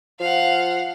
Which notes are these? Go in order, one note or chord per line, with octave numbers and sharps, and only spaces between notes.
F3 F5 F#5